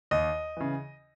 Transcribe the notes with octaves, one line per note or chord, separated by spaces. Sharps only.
D#2 D#5
C#3 E3